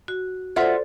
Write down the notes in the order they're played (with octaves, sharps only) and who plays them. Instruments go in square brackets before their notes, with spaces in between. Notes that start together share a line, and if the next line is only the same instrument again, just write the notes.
[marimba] F#4
[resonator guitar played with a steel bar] F4 E5 F#5 [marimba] A4 C5 D5